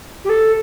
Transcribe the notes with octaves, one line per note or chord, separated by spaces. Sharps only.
G4
A4